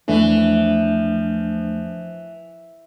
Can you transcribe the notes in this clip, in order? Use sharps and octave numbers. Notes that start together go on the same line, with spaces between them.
E2 E3 F3 A3 D4